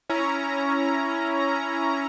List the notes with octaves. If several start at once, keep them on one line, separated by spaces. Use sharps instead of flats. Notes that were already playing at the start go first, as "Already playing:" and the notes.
C#4 E4 A#5